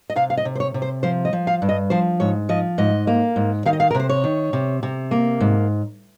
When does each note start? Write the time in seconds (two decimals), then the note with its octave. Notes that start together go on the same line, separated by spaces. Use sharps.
0.10 D#5
0.16 C3 F5
0.30 F5
0.37 D#5
0.45 C3
0.55 C5
0.60 C#5
0.74 C3
0.82 C5
1.03 F3 C5
1.25 D#5
1.33 F3
1.47 F5
1.62 G2
1.69 D#5
1.90 F3 C5
2.20 G#2 C#5
2.49 F3 D#5
2.78 G#2 D#5
3.07 A#3
3.36 G#2
3.66 D#3 F5
3.73 D#5
3.80 F5
3.91 A#4
3.95 C3
4.00 C5
4.09 C#5
4.24 D#3
4.53 C3
4.83 C3
5.11 A#3
5.41 G#2